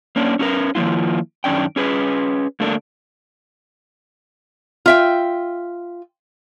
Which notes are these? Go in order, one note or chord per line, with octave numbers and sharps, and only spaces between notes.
A#3 C#4 D4
C#4 E4 F#4 A#4 B4
D#3 F3 A#3 E4 F4
F#2 D#3 C#4 D4 G5
C#4 G#4 B4
D3 A3 A#3 D4 A4 A#4
F4 E5 G5